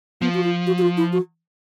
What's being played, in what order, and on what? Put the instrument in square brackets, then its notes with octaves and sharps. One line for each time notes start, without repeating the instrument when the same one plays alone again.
[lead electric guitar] F3 [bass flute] B3
[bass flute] F#4
F4
F#4
F#4
F4
E4
F#4